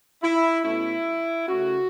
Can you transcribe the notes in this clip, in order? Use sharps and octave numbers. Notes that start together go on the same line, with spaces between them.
E4
B2 A3 C#4 E4
C#3 A3 C#4 F#4